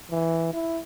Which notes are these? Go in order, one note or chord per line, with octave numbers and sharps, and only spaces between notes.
E3
E4